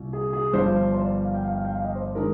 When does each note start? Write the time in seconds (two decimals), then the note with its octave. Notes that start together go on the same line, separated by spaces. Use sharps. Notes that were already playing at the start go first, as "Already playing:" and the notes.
Already playing: C2 A#2
0.13 G#4
0.33 G#4
0.53 G1 G2 F3 C5
0.94 C5
1.04 D5
1.25 F5
1.34 G5
1.44 F5
1.55 F5
1.65 G5
1.75 F5
1.85 D#5
1.95 C5
2.15 D#3 G#3 D4 A#4